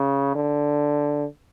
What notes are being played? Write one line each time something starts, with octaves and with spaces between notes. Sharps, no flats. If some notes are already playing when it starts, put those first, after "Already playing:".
Already playing: C#3
D3